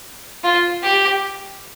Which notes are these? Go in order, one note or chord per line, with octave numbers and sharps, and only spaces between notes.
F4
G4